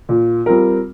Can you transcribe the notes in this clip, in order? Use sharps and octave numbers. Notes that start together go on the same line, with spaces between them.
A#2
G3 C4 F4 A#4